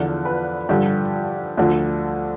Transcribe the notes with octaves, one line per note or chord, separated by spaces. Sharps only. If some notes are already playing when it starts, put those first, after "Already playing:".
Already playing: E2 D3 F3
B4
G2 D3 F3 G4
D2 D3 F3